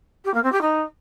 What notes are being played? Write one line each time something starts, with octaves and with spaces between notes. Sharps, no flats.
G4
A#3
C4
G4
D#4